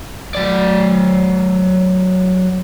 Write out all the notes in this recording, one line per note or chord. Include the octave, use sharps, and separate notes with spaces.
F#3 D5